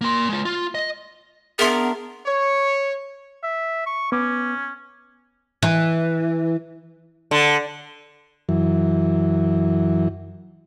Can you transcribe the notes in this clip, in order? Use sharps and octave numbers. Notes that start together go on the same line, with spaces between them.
A#3 C6
G#3 F4
F4
D#5
B3 D4 G#4 A#4 E5 C6
C#5
E5
C#6
B3 C#4 D6
E3
D3
F#2 E3